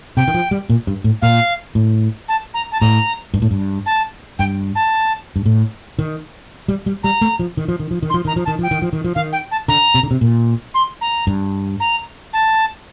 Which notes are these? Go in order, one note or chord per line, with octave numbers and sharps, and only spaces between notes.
C3 G5
D#3
F3
G3
A#2
G2
A2
A#2 F5
A2
A5
A#5
A5
A2 A#5
G2
A2
G2
A5
G2 G5
A5
G2
A2
D#3
G3
G3
G3 A#5
A3
F3
D#3
F3
D#3
F3
D#3
C6
F3
D#3 A#5
F3
D#3 A5
F3 G5
D#3
F3
D#3
F3
D#3 F5
G5
A5
D3 A#5
C3
D3
C3
A#2
C6
A#5
G2
A#5
A5